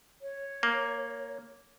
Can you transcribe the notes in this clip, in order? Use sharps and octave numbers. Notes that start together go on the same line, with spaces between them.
C#5
A#3